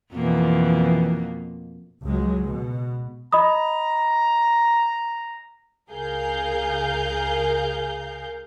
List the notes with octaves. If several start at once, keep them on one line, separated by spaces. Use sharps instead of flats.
F2 B2 E3 A#3
C#2 F#3 G#3
B2
D#5 A#5 B5 D#6
C#2 G#4 A#4 F5 G6